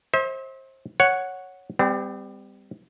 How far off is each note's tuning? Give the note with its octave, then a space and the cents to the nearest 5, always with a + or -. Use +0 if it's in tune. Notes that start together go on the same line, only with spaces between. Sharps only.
C5 +25 E5 -40
C#5 +0 F#5 +0
G3 +20 C4 -35